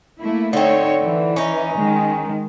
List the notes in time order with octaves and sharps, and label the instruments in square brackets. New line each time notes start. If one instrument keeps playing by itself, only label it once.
[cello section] A3 A#3 E4
[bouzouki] D3 C4 [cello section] D#4 C#5
[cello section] E3
[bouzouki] C#4 D#4
[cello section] D#3 G#3